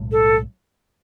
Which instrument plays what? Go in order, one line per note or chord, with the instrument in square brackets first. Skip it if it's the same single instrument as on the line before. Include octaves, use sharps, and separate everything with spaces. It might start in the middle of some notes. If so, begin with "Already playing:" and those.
Already playing: [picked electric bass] B1 A2 G#3
[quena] A4